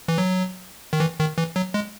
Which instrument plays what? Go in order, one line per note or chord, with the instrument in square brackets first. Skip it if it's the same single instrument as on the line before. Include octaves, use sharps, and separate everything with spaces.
[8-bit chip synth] E3
F#3
D#3
E3
D#3
E3
F#3
G#3